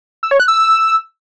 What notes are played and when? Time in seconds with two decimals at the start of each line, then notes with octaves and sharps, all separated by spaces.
0.23 E6
0.31 C#5
0.40 F#6
0.48 E6